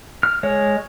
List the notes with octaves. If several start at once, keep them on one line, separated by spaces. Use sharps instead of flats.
F6
G#3 C#5